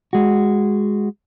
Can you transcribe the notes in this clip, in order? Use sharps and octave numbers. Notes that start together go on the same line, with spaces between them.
G#3 F#4